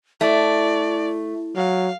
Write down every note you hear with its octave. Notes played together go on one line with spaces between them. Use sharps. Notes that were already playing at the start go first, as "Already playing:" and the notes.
A3 E4 D5
F#3 F5